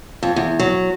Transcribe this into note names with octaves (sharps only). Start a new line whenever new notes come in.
F2
E2
F#3